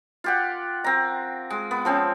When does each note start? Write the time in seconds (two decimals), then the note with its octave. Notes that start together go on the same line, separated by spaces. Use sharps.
0.24 F4 G4 F#5
0.84 C4 A#5
1.50 G#3
1.71 B3
1.85 F3 C4 C#4